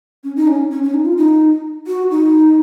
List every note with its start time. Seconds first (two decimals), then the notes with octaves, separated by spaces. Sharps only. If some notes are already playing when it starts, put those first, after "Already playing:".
0.24 C#4
0.36 D#4
0.48 C#4
0.71 C#4
0.83 C#4
0.94 D#4
1.05 F4
1.18 D#4
1.87 F#4
2.11 D#4